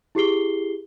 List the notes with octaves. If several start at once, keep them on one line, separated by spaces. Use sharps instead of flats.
E4 G4 G#4 C7 G7